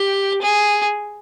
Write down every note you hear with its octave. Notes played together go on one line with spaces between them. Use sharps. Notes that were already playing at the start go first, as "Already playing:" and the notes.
Already playing: G4
G#4